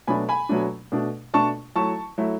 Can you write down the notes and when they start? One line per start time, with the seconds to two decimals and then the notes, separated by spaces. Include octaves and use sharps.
0.07 B2 F#3 A3 D4 G#5 B5
0.29 G#5 B5
0.49 B2 F#3 A3 D4
0.92 B2 A3 D4
1.34 B2 A3 D4 A5 C#6
1.76 F#3 A3 E4 A5 C#6
2.18 F#3 A3 E4